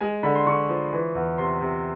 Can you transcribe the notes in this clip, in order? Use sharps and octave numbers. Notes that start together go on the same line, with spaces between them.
G#3 G#5
D3 B5
C6
D3 C#6
F3
E3
E2
C3 C6
C3